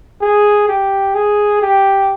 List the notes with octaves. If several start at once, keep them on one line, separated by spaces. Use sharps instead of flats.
G#4
G4
G#4
G4